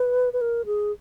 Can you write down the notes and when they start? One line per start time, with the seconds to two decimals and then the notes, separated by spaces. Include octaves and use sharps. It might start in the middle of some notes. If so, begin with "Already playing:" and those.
Already playing: B4
0.33 B4
0.41 A#4
0.66 G#4